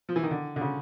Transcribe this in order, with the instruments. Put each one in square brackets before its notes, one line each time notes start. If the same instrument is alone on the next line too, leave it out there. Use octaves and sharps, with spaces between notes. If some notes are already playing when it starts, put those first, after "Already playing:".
[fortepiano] F3
E3
D#3
D3
D3
C#3